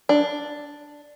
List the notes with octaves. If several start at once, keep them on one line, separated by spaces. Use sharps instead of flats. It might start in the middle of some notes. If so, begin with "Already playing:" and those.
D4